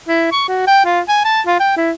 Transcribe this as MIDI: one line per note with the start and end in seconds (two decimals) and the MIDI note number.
0.08 0.31 64
0.32 0.44 85
0.49 0.63 66
0.67 0.82 79
0.85 1.00 65
1.09 1.23 80
1.25 1.41 81
1.46 1.59 65
1.60 1.74 79
1.77 1.91 64